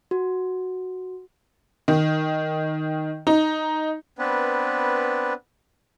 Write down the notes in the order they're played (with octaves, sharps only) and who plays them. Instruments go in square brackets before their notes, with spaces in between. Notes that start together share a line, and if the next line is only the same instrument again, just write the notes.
[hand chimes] F#4
[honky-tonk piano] D#3
D#4
[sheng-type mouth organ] B3 C4 D4 B4